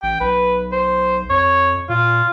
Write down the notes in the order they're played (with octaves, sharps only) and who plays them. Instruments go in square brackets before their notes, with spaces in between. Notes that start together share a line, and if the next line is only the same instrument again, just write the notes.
[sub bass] A1 [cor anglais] G5
[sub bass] B1 [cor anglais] B4
[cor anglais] C5
[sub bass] F2 [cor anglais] C#5
[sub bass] A#2 [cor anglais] F4